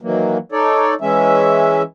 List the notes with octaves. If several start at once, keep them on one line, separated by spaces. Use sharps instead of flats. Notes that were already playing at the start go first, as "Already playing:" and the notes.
D#3 E3 F#3 A#3
D#4 A4 C#5 D5
E3 G#3 C#4 E5